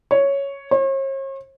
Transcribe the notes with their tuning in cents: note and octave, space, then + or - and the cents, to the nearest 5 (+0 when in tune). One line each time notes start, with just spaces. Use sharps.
C#5 +0
C#5 -45